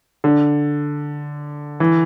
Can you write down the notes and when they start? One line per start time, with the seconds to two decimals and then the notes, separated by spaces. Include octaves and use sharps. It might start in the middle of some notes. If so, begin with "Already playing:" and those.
0.24 D3
1.80 E3